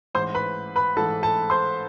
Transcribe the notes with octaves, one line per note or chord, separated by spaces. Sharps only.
A1 G#2 E3 C5 C6
B4 B5
B4 B5
A1 G#2 E3 A4 A5
A4 A5
C5 C6